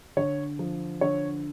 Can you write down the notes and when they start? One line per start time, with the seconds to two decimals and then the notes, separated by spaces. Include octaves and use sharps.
0.17 D3 C#5
0.59 F3
1.01 D3 C#5